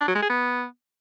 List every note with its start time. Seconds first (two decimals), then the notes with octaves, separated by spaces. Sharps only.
0.01 D4
0.08 F#3
0.15 G#3
0.23 G#4
0.30 B3